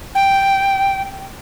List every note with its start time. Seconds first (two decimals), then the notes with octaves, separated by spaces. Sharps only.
0.15 G5